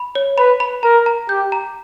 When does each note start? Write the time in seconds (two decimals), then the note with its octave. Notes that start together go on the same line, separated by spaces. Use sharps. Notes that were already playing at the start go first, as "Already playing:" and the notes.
Already playing: B5
0.15 C#5
0.38 B4 B5
0.60 B5
0.83 A#4 A#5
1.06 A#5
1.29 G4 G6
1.52 A#5